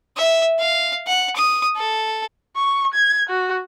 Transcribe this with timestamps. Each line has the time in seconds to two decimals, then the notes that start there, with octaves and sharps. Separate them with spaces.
0.17 E5
0.59 F5
1.07 F#5
1.36 D#6
1.76 A4
2.56 C#6
2.94 G#6
3.29 F#4